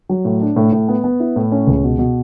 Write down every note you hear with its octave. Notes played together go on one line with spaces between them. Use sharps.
F#3
A2
D4
A2
A2
B3
B3
E4
A2
C#4
C#2
B2
B2